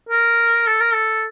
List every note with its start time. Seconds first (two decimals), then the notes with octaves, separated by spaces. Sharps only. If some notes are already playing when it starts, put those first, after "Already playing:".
0.09 A#4
0.67 A4
0.80 A#4
0.94 A4